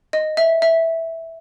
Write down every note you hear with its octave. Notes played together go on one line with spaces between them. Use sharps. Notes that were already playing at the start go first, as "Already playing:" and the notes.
D#5
E5
E5